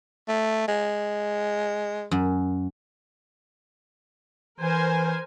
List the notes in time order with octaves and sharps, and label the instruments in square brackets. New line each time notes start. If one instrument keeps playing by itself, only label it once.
[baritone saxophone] A3
G#3
[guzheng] F#2
[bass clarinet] E3 [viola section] A#4 C5 G#5